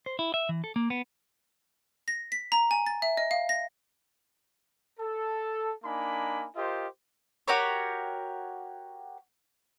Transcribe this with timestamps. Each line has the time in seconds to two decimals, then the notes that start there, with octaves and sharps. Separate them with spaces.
0.06 C5
0.19 E4
0.34 E5
0.49 E3
0.64 A4
0.76 A#3
0.90 B3
2.08 A#6
2.32 B6
2.52 A#5
2.71 G#5
2.86 A6
3.02 E5
3.17 D#5
3.31 F5
3.49 A#6
4.99 A4
5.84 A#3 D4 D#4 G#5 B5
6.56 F4 G4 A#4 C5 D#5
7.48 F#4 G4 A#4 C#5